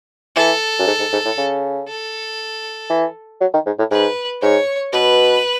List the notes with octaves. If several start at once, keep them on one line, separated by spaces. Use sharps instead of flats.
E3 A4
F#2
G#2
G#2
G#2
A2
C#3
A4
E3
F#3
D#3
G#2
A2
G#2 B4
G#2 C#5
B2 B4